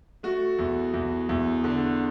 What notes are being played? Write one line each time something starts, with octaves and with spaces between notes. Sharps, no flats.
A3 F#4
E2
E2
E2
D3